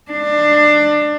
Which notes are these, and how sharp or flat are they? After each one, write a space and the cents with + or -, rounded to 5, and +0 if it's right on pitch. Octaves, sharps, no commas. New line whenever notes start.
D4 +20